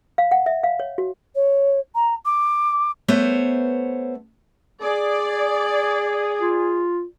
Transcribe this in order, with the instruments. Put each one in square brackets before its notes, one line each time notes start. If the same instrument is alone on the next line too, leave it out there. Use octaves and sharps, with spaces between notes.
[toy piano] F5
F#5
E5
F5
C#5
F#4
[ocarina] C#5
A#5
D6
[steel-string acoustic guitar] A3 B3 C5 C#5
[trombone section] G#4 [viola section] D5
[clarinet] F4